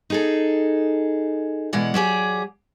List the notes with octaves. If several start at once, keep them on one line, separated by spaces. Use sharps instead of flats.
D#4 G#4 A4
B2 E3 G#3 D5 F#5
F#3 G4 G#4 D5